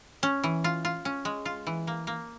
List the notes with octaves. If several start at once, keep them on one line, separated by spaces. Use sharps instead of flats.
C#4
E3
F4
F4
C#4
G#3
F4
E3
A#3
A#3